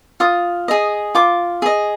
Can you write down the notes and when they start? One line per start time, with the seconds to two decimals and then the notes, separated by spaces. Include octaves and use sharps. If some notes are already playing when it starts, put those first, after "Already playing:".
0.20 F4 D#6
0.68 G#4 D#5
1.15 F4 D6
1.62 G#4 D#5